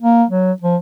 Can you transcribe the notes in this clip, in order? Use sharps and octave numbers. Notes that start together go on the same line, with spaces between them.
A#3
F#3
F3